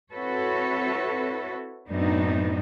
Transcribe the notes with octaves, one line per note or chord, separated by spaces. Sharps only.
C4 E4 F#4 A4 B4 C#5
F#2 A2 B3 C4 D4 D#4